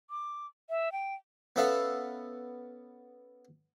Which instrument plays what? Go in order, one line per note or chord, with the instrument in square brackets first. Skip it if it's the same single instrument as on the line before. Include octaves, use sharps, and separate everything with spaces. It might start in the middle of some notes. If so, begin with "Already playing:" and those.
[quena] D6
E5
G5
[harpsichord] B3 C#4 A4 E5 F5